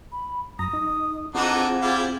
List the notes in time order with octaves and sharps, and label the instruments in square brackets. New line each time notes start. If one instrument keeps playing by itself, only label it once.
[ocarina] B5
[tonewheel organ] F#2 A#5 [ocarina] D#6
[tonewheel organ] D#4
[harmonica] D3 E3 D#4 [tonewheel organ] C4 F4 G#4 [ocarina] F#5
[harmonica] G3 E4 F5